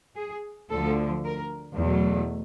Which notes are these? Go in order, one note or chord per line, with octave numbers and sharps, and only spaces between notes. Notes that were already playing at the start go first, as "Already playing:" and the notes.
G#4
D2 D3 F3 A4
A#4
E2 B2 F#3 A3